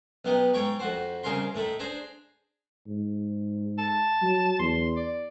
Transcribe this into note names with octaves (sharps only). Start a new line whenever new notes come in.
B1 B3 D#4 G4
G#2 C#5 G5 A#5 C#6
F2 F#4 C5
C2 C#3 G#4 A#4 A#5 C6
A2 A3 D#4 B5
D4 G#4 C5 A#5
G#2
A5
F#3
E2 C6
D5